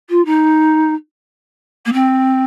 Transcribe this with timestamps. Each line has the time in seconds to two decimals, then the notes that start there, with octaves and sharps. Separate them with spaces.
0.10 F4
0.25 D#4
1.85 A#3
1.93 C4